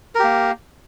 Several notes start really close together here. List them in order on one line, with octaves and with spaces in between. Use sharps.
A#4 G4 A#3